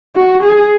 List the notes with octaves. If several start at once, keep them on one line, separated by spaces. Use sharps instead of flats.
F#4
G#4